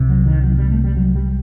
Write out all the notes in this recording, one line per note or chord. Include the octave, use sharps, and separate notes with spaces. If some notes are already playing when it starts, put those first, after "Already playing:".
Already playing: C2 C3
F#3
D#3
F#3
G3
A3
G3
F#3
G3